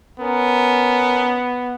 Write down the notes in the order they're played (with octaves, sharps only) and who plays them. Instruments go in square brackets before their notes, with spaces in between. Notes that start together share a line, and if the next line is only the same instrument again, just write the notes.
[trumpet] B3 [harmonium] C#4 A#4